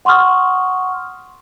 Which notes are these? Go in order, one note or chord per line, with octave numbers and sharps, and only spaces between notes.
F#5 C6 C#6 D#6 F6